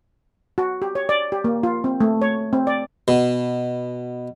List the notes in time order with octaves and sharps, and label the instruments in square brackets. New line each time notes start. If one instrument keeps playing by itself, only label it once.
[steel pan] F#4
G4
C#5
D5
G4
A#3
F4
C4
A3
C#5
C4
D5
[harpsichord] B2